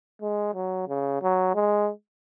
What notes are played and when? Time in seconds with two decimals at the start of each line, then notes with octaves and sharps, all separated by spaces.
0.22 G#3
0.55 F#3
0.88 C#3
1.22 F#3
1.55 G#3